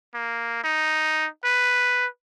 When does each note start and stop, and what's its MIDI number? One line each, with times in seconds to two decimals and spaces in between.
0.14 0.61 58
0.64 1.26 63
1.45 2.06 71